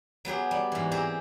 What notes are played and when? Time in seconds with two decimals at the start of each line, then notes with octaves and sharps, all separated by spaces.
0.25 F#3 B3 G4 G#4
0.51 G3
0.72 G#2 E3
0.91 C4 G4 G#4 A#5